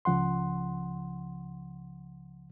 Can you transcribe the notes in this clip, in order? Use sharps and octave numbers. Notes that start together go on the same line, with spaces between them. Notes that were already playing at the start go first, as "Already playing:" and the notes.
C#2 C#3 F3 F#5 C6